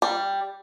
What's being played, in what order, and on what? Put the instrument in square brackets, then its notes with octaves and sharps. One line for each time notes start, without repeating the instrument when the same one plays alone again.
[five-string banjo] G3